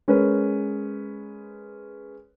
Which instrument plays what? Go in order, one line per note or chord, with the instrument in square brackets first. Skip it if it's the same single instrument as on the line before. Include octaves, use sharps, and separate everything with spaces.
[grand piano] G#3 C#4 G#4 A#4 B4